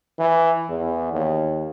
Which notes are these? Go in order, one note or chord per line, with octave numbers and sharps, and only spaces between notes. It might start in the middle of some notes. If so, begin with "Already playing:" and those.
E3
E2
D#2